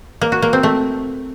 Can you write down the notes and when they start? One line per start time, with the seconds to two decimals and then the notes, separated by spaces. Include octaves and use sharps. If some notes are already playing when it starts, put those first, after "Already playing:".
0.21 A#3
0.32 F#4
0.42 A#3
0.53 C4
0.63 A3